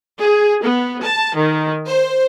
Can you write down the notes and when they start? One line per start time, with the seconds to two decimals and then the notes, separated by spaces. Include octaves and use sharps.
0.20 G#4
0.65 B3
1.03 A5
1.36 D#3
1.86 C5